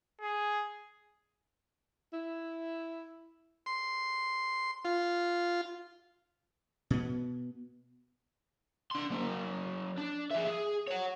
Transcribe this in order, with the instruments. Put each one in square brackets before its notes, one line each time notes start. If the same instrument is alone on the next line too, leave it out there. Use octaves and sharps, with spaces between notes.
[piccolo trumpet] G#4
[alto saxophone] E4
[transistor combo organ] C6
F4
[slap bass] B2 B3
[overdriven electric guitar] D4 C6
F#3 A#3
D4
G#4 E5
G#4
C#5 F#5